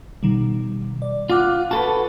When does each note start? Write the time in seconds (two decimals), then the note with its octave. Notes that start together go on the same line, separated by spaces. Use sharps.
0.23 B2 D#3 G3
1.02 D5
1.30 F4 F#5 D6 F#6
1.71 F#4 A4 B4 A5